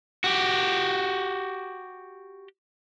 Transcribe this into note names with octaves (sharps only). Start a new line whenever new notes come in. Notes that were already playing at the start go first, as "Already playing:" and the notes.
F#4 G4